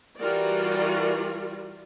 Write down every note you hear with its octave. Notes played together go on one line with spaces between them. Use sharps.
E3 G3 F4 F#4 A#4 D5